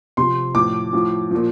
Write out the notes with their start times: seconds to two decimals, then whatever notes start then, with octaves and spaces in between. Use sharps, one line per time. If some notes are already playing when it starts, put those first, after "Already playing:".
0.17 C3 F3 C6
0.55 A2 F3 D6
0.93 A2 F3
1.31 A#2 F3